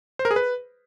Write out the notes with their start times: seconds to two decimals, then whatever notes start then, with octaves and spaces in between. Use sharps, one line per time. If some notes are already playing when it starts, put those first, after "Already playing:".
0.19 C5
0.25 A#4
0.31 G#4
0.36 B4